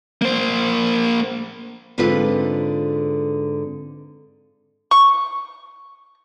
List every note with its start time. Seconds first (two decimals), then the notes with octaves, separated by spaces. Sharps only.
0.22 A#3 C5
1.98 G#2 D3 C4 F4 B4
4.91 C#6